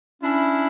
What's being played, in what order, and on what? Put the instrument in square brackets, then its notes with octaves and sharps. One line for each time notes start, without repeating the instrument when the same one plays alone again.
[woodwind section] C#4 [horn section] D4 E4